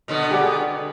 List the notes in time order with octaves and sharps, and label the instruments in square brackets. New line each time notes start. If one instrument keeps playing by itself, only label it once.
[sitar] B2 D3 B3
[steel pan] G4 G#4 D5